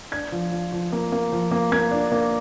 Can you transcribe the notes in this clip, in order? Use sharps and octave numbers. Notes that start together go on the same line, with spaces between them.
D4 G#6
F3
F3
F3
A#3
A#3
F3
A#3
A#3 G#6
D4
A#3